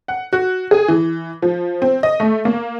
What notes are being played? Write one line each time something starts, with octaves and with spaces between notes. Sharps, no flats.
F#5
F#4
G#4
E3
F3
C4
D#5
A3
A#3